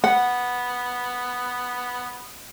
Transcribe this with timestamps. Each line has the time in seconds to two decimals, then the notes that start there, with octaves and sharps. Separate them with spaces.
0.04 B3 F#5